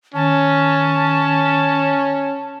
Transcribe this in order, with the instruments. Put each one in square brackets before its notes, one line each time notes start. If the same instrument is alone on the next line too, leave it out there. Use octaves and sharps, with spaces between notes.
[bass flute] D#3 [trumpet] C#4 [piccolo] A5